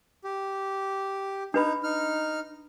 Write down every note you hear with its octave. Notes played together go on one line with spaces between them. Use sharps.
G4
D4 D#4 B4 B5
D#4 F6